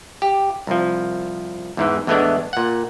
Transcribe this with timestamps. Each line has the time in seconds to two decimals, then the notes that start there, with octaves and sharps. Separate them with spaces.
0.22 G4
0.67 C2 F3
1.77 E2 G#2 E3
2.07 E2 A2 E3 G#3 B3 D4
2.53 A#2 F#5